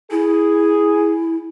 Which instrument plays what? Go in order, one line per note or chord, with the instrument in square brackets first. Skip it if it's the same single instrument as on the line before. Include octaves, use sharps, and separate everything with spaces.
[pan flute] E4 [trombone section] G#4